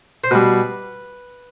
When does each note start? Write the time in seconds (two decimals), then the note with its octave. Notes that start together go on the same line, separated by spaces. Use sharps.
0.24 C5
0.31 B2 G3 B4